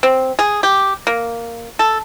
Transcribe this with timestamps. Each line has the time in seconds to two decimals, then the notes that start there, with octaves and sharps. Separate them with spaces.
0.03 C4
0.39 G#4
0.63 G4
1.07 A#3
1.79 A4